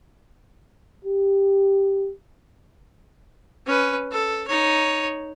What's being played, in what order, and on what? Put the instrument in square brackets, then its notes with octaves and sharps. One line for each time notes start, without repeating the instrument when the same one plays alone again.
[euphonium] G4
[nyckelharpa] C#4 B4
A4
D#4 C#5